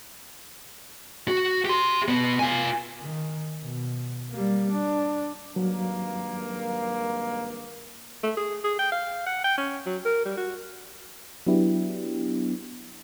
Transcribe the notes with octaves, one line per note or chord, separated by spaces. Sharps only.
F#4
G4 C6
B2 B3
F4 G#5
D#3
B2
G3 A#3
D4
G#1 G2 F#3 A#3
A3
G#4
G#4
G5
F5
F#5
G5
C#4
F#3
A#4
G3
F#4
F#3 B3 D4 E4 G4